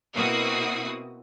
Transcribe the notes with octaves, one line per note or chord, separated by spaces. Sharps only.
B2 A#3 C4 E4 F#4 D#6